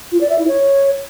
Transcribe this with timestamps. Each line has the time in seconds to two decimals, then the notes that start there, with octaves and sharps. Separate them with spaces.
0.12 F4
0.21 D5
0.30 E5
0.39 E4
0.48 C#5